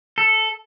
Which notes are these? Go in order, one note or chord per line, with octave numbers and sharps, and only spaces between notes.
A4